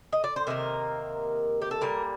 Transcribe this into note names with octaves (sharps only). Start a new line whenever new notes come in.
D#5
D5
C5
C3 D#3 A#3 A#4
G4
A4
A#2 G3 A#3 A#4